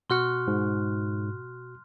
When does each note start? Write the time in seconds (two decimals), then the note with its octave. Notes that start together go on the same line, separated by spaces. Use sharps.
0.10 B2 F#4 C6 C#6 F6 F#6
0.47 G#2